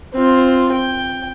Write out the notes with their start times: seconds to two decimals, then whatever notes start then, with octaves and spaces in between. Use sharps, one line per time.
0.14 C4 F4
0.72 G5